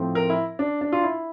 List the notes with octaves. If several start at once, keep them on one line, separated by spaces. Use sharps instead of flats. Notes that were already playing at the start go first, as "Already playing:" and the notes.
Already playing: A2 F3 A3 C4
A#4
E4
D4
D4
F4
E4